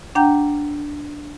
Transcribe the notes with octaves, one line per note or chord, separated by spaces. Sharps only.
D4 F#5 G5 A#5 G6